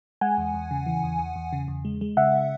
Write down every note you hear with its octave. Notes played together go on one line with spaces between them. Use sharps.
G#3 F#5 G#5
E2
E2
C#3
E3
E2
E2
E2
C#3
E2
G#3
G#3
C#3 E5 F#5